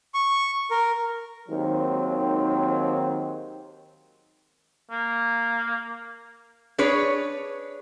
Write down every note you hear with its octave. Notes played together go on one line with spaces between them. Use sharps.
C#6
A#4
D#2 D#3 F#3 G#3 C4
A#3
D4 G#4 B4 C#5